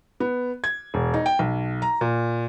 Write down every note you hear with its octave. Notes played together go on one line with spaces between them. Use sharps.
B3
G#6
E1
D#4
G5
B1
A#5
A#2